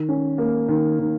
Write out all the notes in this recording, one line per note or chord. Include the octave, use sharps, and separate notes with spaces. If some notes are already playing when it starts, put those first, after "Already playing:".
Already playing: D#3
C#4
A#3
D#3
D#3